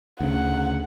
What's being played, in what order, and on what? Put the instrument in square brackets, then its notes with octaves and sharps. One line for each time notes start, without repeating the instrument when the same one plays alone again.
[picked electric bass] D2 C#3 [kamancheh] F#5